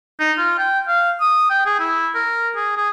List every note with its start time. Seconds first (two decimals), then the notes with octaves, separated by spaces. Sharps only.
0.20 D#4
0.38 F4
0.59 G5
0.88 F5
1.21 D#6
1.50 G5
1.66 G#4
1.80 E4
2.15 A#4
2.56 G#4
2.77 G#4